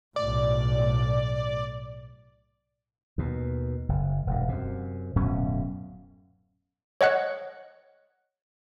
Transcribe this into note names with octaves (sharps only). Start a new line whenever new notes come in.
B1 A2 D5
D#2 B2
F#1
E1 G2
F#2 C3
D1 F#2 B2 C#4
C#5 D#5 F#5 F#6